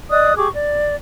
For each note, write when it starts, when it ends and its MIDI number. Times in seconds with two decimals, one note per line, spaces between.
0.10 0.33 74
0.10 0.33 75
0.10 0.33 87
0.10 0.33 90
0.36 0.47 67
0.36 0.47 68
0.36 0.47 85
0.36 0.47 86
0.54 0.95 74